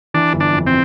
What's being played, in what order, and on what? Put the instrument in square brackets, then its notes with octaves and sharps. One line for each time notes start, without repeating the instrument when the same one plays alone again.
[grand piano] E3 [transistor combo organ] D4
[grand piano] G1
[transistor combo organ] D4
[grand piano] F2
[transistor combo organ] C4